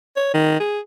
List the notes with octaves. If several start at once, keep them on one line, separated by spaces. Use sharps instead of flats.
C#5
D#3
G#4